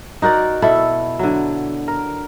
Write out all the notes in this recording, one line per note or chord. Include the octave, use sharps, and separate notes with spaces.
D#4 F#4 A#4 D5
B2 E4 A4
D3 F#3
A#4